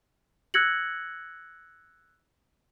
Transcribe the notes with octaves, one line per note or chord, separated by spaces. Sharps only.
E6 F#6 G#6 A#6 C#7 F#7